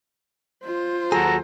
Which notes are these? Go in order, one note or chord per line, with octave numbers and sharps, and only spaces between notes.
F4 C5
D#2 F#3 F#4 G#4 A4 A#5